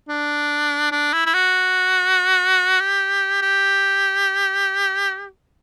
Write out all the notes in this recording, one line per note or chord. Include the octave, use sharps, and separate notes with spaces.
D4
D4
E4
E4
F#4
G4
G4